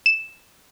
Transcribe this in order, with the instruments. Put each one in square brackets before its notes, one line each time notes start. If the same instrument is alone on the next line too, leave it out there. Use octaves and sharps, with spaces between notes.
[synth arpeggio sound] E7